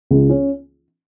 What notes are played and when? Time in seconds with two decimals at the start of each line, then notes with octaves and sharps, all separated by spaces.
0.11 C#2
0.30 C#4